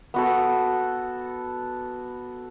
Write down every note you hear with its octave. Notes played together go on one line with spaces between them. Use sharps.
B3 F#4 A4